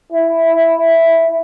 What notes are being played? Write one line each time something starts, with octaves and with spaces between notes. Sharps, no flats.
E4